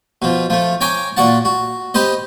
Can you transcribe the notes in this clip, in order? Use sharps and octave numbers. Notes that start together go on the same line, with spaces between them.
B2 F3
F3 A3
C#5 G5 G#5 A#5 D6
A#2 F#4 D5 F#5 A5
F#4
G4 B4 C5 D#5